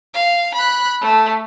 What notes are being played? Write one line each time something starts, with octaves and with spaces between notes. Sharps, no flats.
F5
B5 F#6
A3